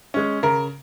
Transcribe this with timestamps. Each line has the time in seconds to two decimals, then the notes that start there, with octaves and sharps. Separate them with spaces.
0.14 G#3 C#4
0.43 C#3 A#4